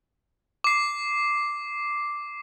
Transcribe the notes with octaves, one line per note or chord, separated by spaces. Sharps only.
D6 C7